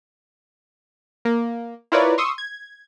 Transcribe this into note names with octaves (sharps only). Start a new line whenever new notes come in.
A#3
E4 F4 A#4 B4 C#5 D5
C6 C#6 D#6 E6
G#6